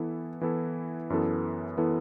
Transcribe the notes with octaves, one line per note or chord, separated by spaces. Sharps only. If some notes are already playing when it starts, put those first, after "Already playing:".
Already playing: E3 B3 E4 A4
E3 B3 E4 A4
F#2 E3 B3 E4 A4
E3 B3 E4 A4